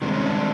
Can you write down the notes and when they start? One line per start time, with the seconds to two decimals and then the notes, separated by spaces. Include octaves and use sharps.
0.02 G2 D#3 G#3 C4 D4
0.14 C#4
0.26 D4